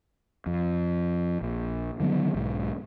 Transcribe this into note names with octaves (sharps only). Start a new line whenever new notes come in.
F2
A#1
D3 D#3 F#3 B3
B1 G#2